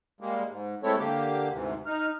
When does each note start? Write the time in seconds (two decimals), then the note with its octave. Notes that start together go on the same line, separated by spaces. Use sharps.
0.21 G3 G#3 A#3
0.50 G#2
0.83 G#3 A3 C4 E4 A4 C#5
0.98 D3 A#3 G4
1.52 D2 G#2 C3 E3
1.86 D#4 F6